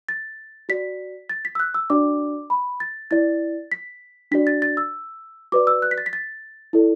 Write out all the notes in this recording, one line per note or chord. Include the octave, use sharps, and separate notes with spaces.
A6
F#4 D5 B6
A6
B6
E6
F#6
E6
D4 F#4 D5 D6
B5
A6
E4 D5 A6
B6
D4 F#4 D5 B6
A6
A6
E6
F#4 B4 D5 D6
E6
F#6
B6
A6
B6
A6
E4 A4 D5